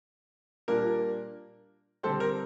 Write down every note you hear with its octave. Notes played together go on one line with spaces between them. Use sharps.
A#2 G3 A#3 D4 A#4
D3 G3 C4 A4 C5
A#4